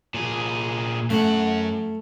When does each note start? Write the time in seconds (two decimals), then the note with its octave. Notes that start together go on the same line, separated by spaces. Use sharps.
0.14 A#2 G#4
1.10 F#2 A3 F#5